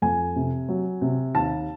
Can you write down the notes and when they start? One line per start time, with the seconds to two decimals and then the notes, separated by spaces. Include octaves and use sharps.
0.02 F2 G#5
0.36 C3
0.69 F#3
1.01 C3
1.35 D#2 A5